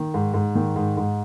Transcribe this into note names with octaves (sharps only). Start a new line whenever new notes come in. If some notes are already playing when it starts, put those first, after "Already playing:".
Already playing: D#3
G#2
G#2
D#3
G#2
G#2